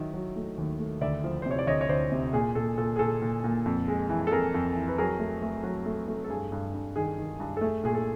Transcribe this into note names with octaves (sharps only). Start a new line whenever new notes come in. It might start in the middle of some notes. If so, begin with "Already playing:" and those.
Already playing: D#3 F#3 E5
F#3
A3
D#2
A3
D2 D5 E5
F3
C5
C3 C#5
D5
D2 C#5 D#5
C#5
D2 C5 D5
C3
A#2 G#4
A#2 A4
A#2 A4
G#4
A#2 A4
A#2
A#2
F2
G#3
E3
A4
F2 G#4 A#4
F2
E3
B4
F#3 G#4 A#4
A3
A3
F#3
A3
A3
A4
G2 G#4
G2
G2
D#3 G#4
D#3
G2
A4
A3 G#4
A#2 G#4
A4